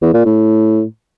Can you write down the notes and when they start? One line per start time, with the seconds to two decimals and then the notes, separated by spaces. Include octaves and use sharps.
0.02 E2
0.14 A#2
0.25 A2